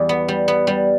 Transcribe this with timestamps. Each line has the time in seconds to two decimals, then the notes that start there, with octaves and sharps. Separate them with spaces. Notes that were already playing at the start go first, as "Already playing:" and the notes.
Already playing: E2 G3
0.09 B3
0.28 G3
0.48 B3
0.67 G3